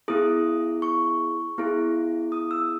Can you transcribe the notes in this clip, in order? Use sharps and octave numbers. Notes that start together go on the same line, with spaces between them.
B3 E4 G#4 D#6
C#6
B3 E4 G#4
D#6
E6